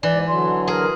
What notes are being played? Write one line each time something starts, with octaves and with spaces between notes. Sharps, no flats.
G#2 E3 D5
D3 F#3 C6
G#4 A#4